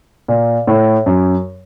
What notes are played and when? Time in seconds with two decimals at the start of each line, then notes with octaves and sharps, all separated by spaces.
0.28 A#2
0.67 A2
1.06 F#2